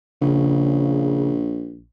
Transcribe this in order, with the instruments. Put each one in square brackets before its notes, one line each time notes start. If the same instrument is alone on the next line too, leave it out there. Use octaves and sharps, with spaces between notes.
[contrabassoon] A#1 [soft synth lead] C#3